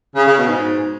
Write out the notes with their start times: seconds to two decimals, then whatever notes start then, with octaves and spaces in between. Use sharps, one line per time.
0.15 C#3
0.26 C#3
0.37 B2
0.47 G#2